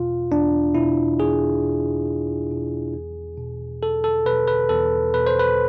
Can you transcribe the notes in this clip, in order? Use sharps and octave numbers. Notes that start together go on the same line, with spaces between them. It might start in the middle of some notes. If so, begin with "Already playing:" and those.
Already playing: E2 B2 F4
E2 D4
B2 E4
E2 G#4
B2
E2
B2
E2
B2
E2 A4
A4
B2 B4
B4
E2 A4
B2 B4
C5
B4